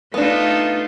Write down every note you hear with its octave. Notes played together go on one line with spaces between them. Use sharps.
A3 B3 D4 D#4 F4